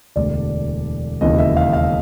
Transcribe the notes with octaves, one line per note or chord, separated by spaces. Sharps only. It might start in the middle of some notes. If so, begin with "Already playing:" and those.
E1 D2 D3 D5
E1 D#2 C#3 E3 D#5
E5
F5
F5